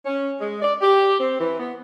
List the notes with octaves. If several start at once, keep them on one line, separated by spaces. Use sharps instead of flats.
C#4
G#3
D5
G4
C4
E3
B3